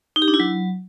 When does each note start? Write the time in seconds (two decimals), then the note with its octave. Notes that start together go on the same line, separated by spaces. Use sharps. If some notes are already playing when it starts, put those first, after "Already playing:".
0.16 D#4
0.22 G4
0.28 D4
0.34 E4
0.40 F#3